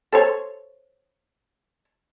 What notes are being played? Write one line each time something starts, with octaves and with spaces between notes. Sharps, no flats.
A4 C5 C#5